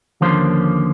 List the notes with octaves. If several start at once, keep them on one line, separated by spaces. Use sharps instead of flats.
D#2 D3 F3 A#3 C#4 C5